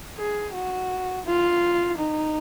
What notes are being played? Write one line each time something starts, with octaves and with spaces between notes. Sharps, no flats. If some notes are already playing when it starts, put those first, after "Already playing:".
G#4
F#4
F4
D#4